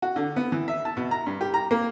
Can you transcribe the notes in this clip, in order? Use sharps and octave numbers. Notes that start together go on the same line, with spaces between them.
F#4
D3
B3
E3
E5
A5
B2
A#5
G2
G4
A#5
A#3